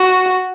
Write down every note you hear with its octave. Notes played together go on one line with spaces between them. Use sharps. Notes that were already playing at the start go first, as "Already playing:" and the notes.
Already playing: F#4